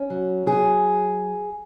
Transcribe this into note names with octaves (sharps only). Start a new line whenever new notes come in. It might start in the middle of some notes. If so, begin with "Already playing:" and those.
Already playing: C#4
F#3
F#3 G#4